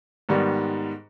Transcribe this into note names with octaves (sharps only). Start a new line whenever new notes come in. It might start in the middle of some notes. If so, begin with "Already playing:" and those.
G#2 D#3 G3 B3